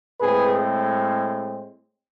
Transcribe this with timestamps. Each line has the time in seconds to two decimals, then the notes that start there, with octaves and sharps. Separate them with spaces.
0.20 A2 G#3 C4 G#4 B4